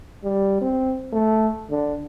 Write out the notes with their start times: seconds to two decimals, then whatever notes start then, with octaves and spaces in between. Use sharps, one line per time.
0.24 G3
0.61 C4
1.12 A3
1.71 D3